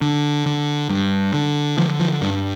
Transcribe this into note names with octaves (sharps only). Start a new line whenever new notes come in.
D3
D3
G2
D3
D3 F3
F3
G2 G3